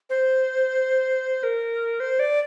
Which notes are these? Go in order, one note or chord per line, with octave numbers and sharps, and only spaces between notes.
C5
A#4
C5
D5